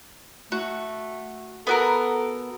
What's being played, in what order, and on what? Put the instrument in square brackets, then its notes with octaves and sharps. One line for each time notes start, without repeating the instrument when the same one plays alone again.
[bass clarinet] A3 [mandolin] F#4
[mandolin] B3 F#4 A#4 [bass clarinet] A4